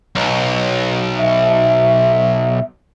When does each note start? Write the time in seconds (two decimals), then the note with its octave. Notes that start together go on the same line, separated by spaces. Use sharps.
0.16 B1
1.18 E5